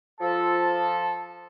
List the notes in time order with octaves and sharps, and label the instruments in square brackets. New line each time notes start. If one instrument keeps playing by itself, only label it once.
[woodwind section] F3 A4 [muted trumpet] A5